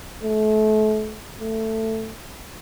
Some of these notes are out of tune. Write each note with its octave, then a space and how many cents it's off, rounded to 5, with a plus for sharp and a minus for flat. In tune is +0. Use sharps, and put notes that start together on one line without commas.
A3 -35
A3 +10